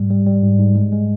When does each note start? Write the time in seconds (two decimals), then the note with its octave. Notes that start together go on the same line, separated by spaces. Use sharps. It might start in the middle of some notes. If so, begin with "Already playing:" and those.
Already playing: G#2 G3
0.10 G3
0.26 G3
0.42 G#2
0.59 G#2
0.75 G#3
0.92 G#3